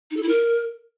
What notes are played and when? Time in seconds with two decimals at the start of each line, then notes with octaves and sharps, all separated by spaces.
0.11 D#4
0.17 A4
0.23 E4
0.29 A#4